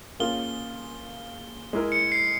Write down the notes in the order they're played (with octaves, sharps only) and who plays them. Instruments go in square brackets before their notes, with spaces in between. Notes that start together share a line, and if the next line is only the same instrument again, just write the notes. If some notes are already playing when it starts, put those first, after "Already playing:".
[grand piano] A#3 C#4 F4 G#4 [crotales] G7
[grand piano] G#3 E4 A#4
[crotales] C#7
C7